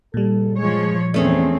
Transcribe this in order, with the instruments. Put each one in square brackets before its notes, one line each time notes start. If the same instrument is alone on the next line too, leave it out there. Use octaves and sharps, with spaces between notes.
[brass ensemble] G1 C#2 A4 [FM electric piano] A#2 G3
[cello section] F3 C#5 [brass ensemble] G#3
[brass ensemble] G1 B4 D5 [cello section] E2 C4 [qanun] A3 C#4 G#4